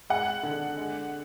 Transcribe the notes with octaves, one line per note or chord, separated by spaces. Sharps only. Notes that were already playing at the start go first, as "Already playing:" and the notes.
G#3 F#5
D3
G#3